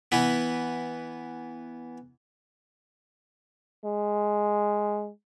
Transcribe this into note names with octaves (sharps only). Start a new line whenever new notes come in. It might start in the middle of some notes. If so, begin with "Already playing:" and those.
E3 B3
G#3